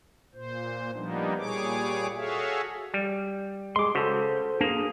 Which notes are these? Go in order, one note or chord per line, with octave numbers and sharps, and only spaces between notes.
A#2 C5
F3 G3 A#3 B3 D4 D#4
A#2 G3 G#4 C#5 D6
F#4 G#4 A4 C#5 E5 F5
G3
G#3 G#4 C6 D6
C#3 F#4 A4 C5
A#3 D4 G#4